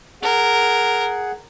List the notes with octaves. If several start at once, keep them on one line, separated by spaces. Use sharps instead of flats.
G#4 A#4 F#5